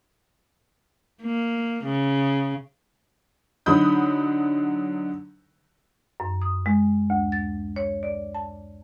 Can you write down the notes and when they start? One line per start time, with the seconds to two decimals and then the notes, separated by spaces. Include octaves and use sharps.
1.23 A#3
1.85 C#3
3.66 D3 F#3 D#4 B5 D#6 G6
6.20 F#2
6.42 D#6
6.66 G#3
7.10 D2
7.32 A6
7.76 C#5
8.03 D5
8.34 A5